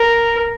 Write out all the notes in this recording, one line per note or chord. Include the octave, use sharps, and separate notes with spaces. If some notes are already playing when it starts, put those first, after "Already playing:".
Already playing: A#4